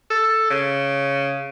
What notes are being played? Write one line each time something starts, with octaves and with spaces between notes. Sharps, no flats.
A4
C#3